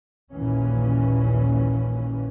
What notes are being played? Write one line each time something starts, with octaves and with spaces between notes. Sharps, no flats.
A#1 D#2 A#2 E3 C#4